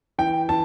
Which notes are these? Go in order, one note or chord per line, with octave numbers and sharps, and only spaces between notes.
E3 G5
E3 A5